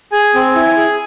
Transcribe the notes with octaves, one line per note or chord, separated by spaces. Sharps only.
G#4 G#5
C4
E4
G#4